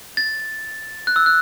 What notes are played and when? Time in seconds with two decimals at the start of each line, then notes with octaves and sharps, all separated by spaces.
0.17 A6
1.07 F#6
1.16 E6
1.26 F#6